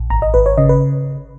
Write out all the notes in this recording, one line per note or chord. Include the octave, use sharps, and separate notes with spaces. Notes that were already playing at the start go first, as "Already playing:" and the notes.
Already playing: A#1
G#1 A#5
D#5
G#1 B4
C#5
C#3 D#5
B4